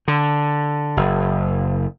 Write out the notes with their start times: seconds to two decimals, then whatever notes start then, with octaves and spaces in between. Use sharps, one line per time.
0.08 D3
0.97 F#1